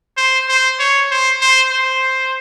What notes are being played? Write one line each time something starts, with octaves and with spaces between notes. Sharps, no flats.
C5
C5
C#5
C5
C5
C5